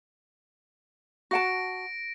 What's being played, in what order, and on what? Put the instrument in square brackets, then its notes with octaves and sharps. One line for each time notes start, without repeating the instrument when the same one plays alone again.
[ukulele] F#4 F#5 A5 [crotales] A#6 D7